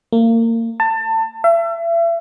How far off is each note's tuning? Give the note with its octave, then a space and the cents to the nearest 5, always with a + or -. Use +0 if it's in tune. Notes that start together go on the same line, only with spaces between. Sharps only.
A#3 -30
A5 +25
E5 +35